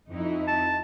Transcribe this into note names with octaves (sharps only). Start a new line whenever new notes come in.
F2 D#4 E4
A5